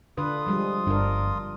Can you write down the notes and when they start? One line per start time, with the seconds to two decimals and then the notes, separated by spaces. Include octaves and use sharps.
0.17 D3 D4 F4 B4 D#6
0.46 F3 G3 G#3
0.87 G1 D4 A#4